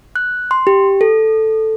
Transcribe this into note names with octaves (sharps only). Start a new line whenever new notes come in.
F#6
C6
G4
A4